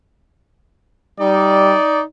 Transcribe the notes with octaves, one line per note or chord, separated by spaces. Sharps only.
G3 D#4 D5